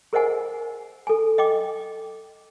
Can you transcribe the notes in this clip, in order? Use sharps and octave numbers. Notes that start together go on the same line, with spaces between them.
G#4 A#4 C5 D#5 F#5 G#5
A4 G#5
D#5 G5 D6